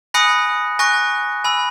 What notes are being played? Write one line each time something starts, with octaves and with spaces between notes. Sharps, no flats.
G#5 B5 D#6 F#6 A#6 C#7
G#5 C#6 F#6 A#6
G#5 B5 E6